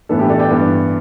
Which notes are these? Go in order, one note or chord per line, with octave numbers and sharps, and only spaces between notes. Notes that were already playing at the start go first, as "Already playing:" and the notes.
A2 E3 B3 D4 A4
G4 B4
A4 D5
D5 G5
G2 E3 B3